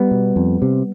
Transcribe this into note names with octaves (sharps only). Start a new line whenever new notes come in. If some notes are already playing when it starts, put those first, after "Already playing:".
Already playing: G3 B3
B2
F2
C3